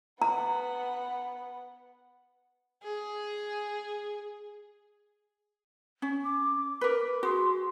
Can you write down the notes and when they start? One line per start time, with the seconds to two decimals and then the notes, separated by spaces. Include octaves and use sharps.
0.22 B3 F#5 A#5
2.84 G#4
6.02 C#4
6.24 D6
6.81 A#4 B4
7.23 F#4 G#4 C6